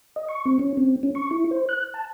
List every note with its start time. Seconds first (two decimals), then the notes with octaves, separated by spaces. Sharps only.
0.16 D#5
0.28 C#6
0.45 C4
0.59 C#4
0.77 C4
1.03 C#4
1.15 C#6
1.31 E4
1.51 C5
1.69 F#6
1.94 A5